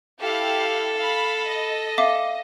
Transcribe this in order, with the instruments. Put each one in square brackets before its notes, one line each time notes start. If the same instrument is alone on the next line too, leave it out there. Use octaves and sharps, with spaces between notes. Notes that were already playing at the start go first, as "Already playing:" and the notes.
[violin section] E4 G4 F5 [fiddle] A4
[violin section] F5 B5
D#5
[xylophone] E5 F5 D6